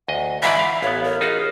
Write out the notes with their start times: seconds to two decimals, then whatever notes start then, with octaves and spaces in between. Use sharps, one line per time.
0.08 D2 D#5 F#5
0.43 G#2 E3 D5 E5 B5
0.59 F5
0.82 A1 B3 C#5 F5
1.04 A#4 C#5
1.21 D#4 F4 F#4 G#4